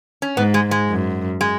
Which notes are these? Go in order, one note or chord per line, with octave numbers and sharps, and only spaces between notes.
C#4
G#2 B3
G#3
G#3
F#2
G#3